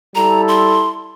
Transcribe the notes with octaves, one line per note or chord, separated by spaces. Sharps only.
G3 E4 A4 A#5
C6